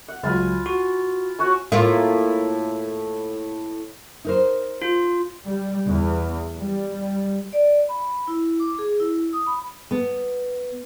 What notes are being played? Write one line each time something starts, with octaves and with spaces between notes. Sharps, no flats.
F#5
C#2 F#3 F4 G#5 B5
F#4
F#4 C#5 G#5
A2 A#3 F4
D#4 A#4 C5
F4
G3
E2
G3
D5
B5
E4
D6
G#4
E4
D#6
B5
B3